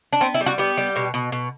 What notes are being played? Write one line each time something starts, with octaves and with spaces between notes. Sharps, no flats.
D4
B3 C4
E4
G3
F#4
B3 G4
G3
B2
B2
B2